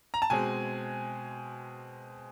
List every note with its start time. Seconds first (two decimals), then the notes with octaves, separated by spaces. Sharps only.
0.14 A#5
0.22 A5
0.30 B2 G#3 C4 G#5